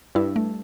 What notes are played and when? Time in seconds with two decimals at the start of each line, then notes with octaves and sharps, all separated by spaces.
0.15 G2 E4
0.36 A3